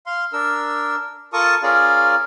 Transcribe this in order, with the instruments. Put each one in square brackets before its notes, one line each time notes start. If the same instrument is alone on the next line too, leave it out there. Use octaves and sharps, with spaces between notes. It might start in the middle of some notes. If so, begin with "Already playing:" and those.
[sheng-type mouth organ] F5 C6
D4 A#4 E6
F4 A4 A#4 A5 C#6 D#6
C#4 F4 G#4 A#4 D5 F5